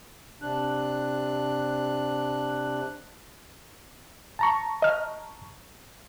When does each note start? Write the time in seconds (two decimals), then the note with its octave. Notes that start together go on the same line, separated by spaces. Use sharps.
0.42 C3 D4 F#6
4.39 A5 A#5 C#6
4.82 D#5 F6